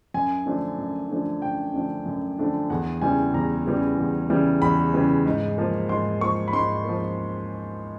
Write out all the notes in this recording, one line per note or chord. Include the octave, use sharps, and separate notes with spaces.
F#2 G#5
D3 F3 A3 D4
F#2
D3 F3 A3 D4
F#2 G5
D3 F3 A3 D4
F#2
D3 F3 A3 D4
E2 F#5
C#3 E3 G3 G#5
E2 A#5
C#3 E3 G3
E2
C#3 E3 G3
E2 B5
C#3 E3 G3
G#2
F3 A#3
G#2 C6
F3 A#3 C#6
B5
G#2 C6
F3 A#3